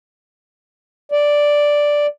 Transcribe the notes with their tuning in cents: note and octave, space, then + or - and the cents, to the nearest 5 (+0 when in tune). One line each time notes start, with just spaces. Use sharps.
D5 +0